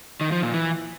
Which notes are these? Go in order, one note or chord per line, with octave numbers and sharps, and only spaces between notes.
D#3
F3
A#2
E3